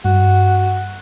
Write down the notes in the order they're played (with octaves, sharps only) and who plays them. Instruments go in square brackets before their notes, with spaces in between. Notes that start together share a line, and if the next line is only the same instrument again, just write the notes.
[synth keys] G2 [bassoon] F#4